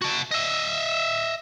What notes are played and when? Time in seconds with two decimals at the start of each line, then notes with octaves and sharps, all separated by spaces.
0.02 F#4 A5
0.31 D#5 E5